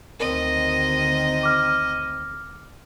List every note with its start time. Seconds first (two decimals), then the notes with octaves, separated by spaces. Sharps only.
0.20 D2 D#3 C4 A#4 D#5
1.43 D6 F6